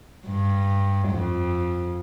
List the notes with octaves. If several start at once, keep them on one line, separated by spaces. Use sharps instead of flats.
G2
F2